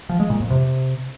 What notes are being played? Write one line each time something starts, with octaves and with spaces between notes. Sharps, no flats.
F3
G#3
A#2
F2
C3